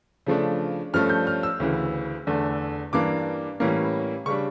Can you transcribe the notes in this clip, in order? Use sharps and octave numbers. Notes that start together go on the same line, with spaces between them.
C#3 F3 A3 D4
G2 F3 A3 C#4 F6
G6
F6
E6
D2 C#3 E3
E2 D3 A3
G2 E3 A#3 D4 D6
A2 E3 G3 A#3 C#4
C#3 G3 D4 C#6